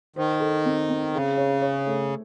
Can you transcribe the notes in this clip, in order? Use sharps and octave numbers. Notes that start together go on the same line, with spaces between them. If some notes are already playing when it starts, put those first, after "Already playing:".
D#3 C5
A4
C4
C4
C#3 G#4
C#5
C#5
A3